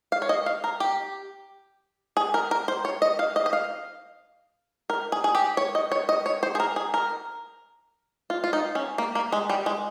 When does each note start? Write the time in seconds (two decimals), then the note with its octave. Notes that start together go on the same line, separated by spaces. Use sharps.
0.12 F5
0.22 C#5
0.29 D#5
0.46 F5
0.64 A#4
0.80 G4
2.17 G#4
2.34 A#4
2.51 A#4
2.68 C5
2.85 C#5
3.02 D#5
3.19 F5
3.36 D#5
3.46 D#5
3.53 F5
4.90 A#4
5.12 G#4
5.24 G#4
5.35 G4
5.57 C#5
5.75 D#5
5.92 C#5
6.09 D#5
6.26 C#5
6.43 C5
6.55 G#4
6.60 A#4
6.76 G#4
6.94 A#4
8.30 F4
8.44 F4
8.53 D#4
8.75 C#4
8.98 A#3
9.15 A#3
9.32 G#3
9.50 G3
9.66 G#3